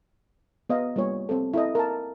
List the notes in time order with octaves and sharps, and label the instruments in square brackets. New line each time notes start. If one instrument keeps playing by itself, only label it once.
[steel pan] B3 D#5 F5
G3 A#3 F4 C#5
C4 A4
E4 A4 D#5
A#4 A5